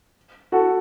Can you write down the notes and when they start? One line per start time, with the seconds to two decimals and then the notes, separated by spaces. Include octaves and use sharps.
0.52 F#4 A4